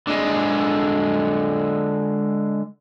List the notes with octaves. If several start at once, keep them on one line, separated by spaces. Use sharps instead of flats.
D3 G#3